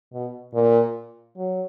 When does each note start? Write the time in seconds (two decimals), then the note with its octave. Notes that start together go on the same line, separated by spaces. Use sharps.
0.13 B2
0.54 A#2
1.37 F#3